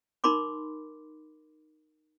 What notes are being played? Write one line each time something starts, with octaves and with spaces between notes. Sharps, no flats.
D#4 A#4 B5 C6 D6